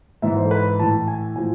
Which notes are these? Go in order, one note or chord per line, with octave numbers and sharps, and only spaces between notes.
G#2 E3 E5
C5
A4
B4
A2 E3 A5
G#5
A2 F3 G#5